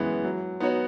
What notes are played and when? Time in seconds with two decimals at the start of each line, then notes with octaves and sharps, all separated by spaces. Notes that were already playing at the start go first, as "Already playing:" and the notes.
Already playing: F#2 E3 G#3 B3
0.25 F#3
0.60 B3 D#4 F#4 C#5